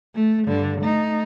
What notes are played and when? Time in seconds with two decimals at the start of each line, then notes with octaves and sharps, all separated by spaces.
0.15 A3
0.47 G2 D3
0.81 A3 D#4